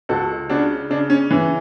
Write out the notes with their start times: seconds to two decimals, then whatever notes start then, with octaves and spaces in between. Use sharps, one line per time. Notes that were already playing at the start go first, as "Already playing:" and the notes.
0.09 C#2 F#4 A4
0.50 C#3 D4 F#4
0.90 C#3 D4
1.10 C#4
1.31 E3 C#4